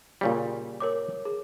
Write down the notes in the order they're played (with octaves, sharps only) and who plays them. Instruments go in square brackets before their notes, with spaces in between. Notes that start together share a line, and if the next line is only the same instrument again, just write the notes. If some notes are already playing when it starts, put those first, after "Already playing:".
[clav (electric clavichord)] A#2 C#3 G3
[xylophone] A#4 C#5 D6
G#4